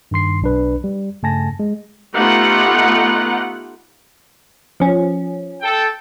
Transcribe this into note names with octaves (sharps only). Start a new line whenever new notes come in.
G2 D#3 C6 C7
B1 D4 B4
G3
G2 C#3 A3 G#5 A5 A#6
G#3
A3 B3 D#4 F4 G4 F#5
F3 C#4
A4 G5